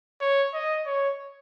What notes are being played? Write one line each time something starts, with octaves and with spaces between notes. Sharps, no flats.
C#5
D#5
C#5